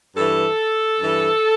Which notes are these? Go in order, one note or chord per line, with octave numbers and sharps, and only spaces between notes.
G2 E3 A4
G2 E3